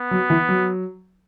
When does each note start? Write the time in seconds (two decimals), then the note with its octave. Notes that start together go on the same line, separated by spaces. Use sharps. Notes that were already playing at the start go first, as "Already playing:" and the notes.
Already playing: B3
0.11 F#3
0.30 E3
0.49 F#3